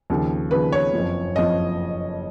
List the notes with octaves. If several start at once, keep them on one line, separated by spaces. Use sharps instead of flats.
D#2 C#3 F3
D#2 C#3 F3 B4
C#5
F#1 F2 F3
F#1 F2 F3 D#5